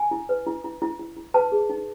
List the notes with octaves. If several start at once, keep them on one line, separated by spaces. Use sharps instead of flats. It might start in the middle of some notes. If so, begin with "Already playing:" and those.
Already playing: G#5
E4
B4
E4
E4
E4
E4
E4
B4 A5
G#4
D#4